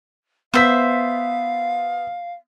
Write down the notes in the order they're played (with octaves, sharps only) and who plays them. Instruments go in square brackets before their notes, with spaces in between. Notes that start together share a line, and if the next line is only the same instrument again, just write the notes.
[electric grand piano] B3 B6 [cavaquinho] C5 E5 [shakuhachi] F5